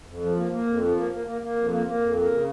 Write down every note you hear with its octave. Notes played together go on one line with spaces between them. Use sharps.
F2
F3
A#3
A#3
F2
F3
A#3
A#3
A#3
A#3
F2
A#3
A#3
F2
A#3
C#3